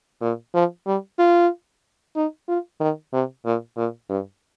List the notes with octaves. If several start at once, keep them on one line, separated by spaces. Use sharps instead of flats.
A#2
F3
G3
F4
D#4
F4
D#3
C3
A#2
A#2
G2